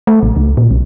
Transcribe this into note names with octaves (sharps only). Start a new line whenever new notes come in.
A3
A1
C#2
A#2
B1